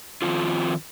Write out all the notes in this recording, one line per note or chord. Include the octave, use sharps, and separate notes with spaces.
D#3 F3 C4 F4